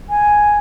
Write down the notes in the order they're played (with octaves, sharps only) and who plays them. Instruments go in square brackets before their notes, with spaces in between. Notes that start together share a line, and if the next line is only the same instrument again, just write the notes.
[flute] G#5